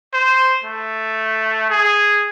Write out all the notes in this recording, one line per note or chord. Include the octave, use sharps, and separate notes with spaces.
C5
A3
G#4